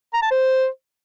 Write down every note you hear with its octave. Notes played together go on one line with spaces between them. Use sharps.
A#5
A5
C5